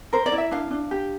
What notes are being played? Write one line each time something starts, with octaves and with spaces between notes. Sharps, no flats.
A#4 C5
D5
E4
E5
D4 F5
D4
G4